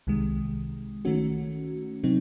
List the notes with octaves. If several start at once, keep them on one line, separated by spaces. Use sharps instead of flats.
C2 C3 D#3 G#3
D#3 A3 C#4 F#4
C3 F#3 C4 D#4